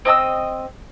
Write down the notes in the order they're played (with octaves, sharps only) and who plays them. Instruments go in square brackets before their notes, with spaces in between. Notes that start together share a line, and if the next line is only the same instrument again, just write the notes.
[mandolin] C4 D#5 A5 E6